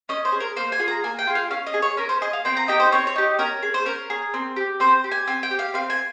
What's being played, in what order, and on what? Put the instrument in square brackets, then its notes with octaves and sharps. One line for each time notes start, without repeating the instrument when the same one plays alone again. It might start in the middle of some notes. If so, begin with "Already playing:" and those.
[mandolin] C#4 D#5
C5
G#4
A#4
A#3 C5
G#5
F4 G#4
A#5
A#3 G#5
G5
F4 G#4
F5
C#4 F5
D#5
G#4
C#5
C#4 A#4
C5
G#4 D#5
F5
C4 G5
A#5
D#4 G4 G5
C5
C4 C#5
C#5
D#4 G4
C#4 A#4
G#4
C5
C#4 A#4
G#4
C4
G4
C4 C5
G4
G#5
C4 G#5
G5
G4
F5
C4 F5
G#5